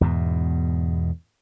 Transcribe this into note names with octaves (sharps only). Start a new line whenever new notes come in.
E2 G#2 B2